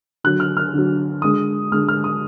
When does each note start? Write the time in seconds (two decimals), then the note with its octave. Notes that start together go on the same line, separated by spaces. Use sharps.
0.24 D3 F#3 F#6
0.40 F6
0.57 F6
0.73 D3 F#3
1.22 D3 G#3 D#6
1.72 D3 G#3 F6
1.88 F6
2.04 D#6